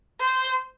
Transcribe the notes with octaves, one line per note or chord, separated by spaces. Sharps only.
C5